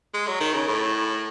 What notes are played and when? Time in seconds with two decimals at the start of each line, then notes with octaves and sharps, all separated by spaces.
0.14 G#3
0.27 F#3
0.41 D#3
0.54 C#3
0.68 A2